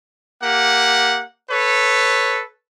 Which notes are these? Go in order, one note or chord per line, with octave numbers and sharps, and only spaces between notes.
A#3 G4 F#5
A4 B4 C#5